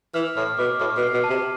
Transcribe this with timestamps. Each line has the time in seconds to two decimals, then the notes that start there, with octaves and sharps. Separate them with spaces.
0.14 E3 F6
0.37 A2 F6
0.58 B2 D6
0.80 A2 F6
0.97 B2
1.03 C7
1.13 B2
1.24 A5
1.30 C3